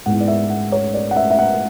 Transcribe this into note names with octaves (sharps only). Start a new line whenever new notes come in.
G#2 G#3 B3 E4 F#5
D5
E5
F#5
C#5
D5
F#5
E5
E5
F#5